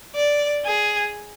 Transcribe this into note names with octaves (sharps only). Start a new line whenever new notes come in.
D5
G#4